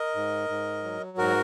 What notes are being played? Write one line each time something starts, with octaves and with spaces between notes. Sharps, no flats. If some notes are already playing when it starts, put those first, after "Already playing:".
Already playing: A#4 D#5
G#2
G#2
F#3
G#2 F#4 A#4